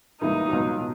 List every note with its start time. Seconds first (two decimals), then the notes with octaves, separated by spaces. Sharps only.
0.21 C#2 C3 E3 G3 A#3 D#4
0.49 C#2 B2 F#3
0.79 B2